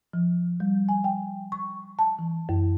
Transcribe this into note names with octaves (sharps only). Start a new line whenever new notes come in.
F3
G3
G#5
G5
C#6
A5
E3
F#2